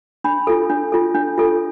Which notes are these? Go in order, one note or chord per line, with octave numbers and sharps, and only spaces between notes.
D4 B5
F4 A4
D4
F4 A4
D4
F4 A4